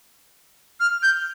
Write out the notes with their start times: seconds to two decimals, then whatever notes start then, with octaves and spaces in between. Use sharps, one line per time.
0.80 F6
1.03 G6